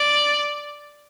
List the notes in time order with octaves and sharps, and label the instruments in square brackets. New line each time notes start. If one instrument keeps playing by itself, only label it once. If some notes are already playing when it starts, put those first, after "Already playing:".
Already playing: [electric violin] D5